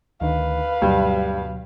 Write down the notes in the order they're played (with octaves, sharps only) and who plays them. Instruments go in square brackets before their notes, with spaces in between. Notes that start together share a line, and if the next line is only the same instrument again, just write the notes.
[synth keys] D2 D#3 [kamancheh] B4 F5
[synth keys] D2 B2 F#3 [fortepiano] G2